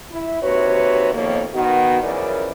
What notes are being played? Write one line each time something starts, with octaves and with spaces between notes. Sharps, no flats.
E4
D#2 C3 F#4 B4 C#5
F2 B2 D#3 A#3 C#5
D#3 B3 F#4
F#2 C#3 E3 F3 A#4 D5